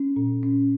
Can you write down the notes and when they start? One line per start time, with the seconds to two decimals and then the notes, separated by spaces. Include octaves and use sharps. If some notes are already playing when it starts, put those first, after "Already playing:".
Already playing: C#4
0.16 A#2
0.43 C#4